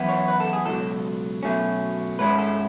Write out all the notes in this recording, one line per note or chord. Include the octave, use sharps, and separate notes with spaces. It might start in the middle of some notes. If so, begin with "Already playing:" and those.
Already playing: F#2 E3 B3 E4
C#5
B4
A4
G#4
C#2 B2 F#3 A4
B2 F#3 A3 C#4
G#2 G#3 C#4 E4 B4
A4